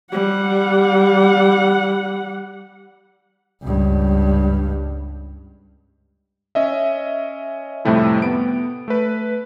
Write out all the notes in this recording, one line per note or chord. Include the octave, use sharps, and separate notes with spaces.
G3 F#5
C#2 G2
C#4 D#5 E5
F2 A2 C3 G3 A3 E4
B3 D7
A3 B4